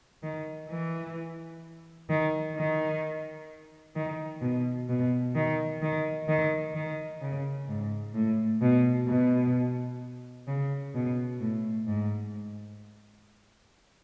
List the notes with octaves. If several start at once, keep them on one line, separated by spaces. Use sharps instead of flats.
D#3
E3
D#3
D#3
D#3
B2
B2
D#3
D#3
D#3
D#3
C#3
G#2
A2
B2
B2
C#3
B2
A2
G#2